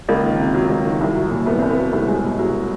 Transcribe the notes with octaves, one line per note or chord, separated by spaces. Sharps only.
C#2 A#3
D#3
C3
F#3
C#2
D#3
C2
F#3
A#2
C2 B3
C2 C4
B3
F#3
C2 A3
F#3 G#3
B2
C2 F#3